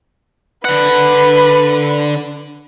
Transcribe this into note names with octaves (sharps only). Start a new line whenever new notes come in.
D3 B4 F#5